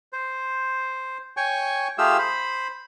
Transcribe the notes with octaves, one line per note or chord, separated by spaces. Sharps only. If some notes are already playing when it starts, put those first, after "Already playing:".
C5
C#5 G5 G#5 C#6
A3 F4 G4 G#4 F5 E6
C5 B5